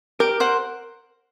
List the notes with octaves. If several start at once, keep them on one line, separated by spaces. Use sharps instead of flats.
G4 A#4
C5 F#5